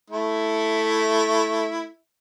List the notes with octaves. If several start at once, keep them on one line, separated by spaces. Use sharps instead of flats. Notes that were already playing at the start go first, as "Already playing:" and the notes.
A3 E4